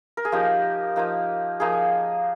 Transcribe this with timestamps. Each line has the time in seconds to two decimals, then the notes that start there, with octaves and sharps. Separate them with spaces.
0.17 A#4
0.25 G#4
0.32 F3 A#3 D#4 G4
0.96 F3 A#3 D#4
1.60 F3 A#3 D#4 G#4